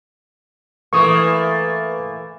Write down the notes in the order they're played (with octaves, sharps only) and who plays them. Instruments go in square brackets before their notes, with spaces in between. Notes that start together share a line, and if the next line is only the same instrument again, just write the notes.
[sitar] E3 A3 A#3 [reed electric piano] C#6 D#6